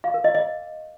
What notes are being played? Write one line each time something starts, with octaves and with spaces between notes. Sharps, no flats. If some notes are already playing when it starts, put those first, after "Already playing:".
F5
A#4
D#5
D#5